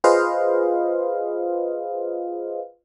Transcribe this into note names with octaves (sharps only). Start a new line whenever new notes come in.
F4 G#4 B4 C5 D#5 F5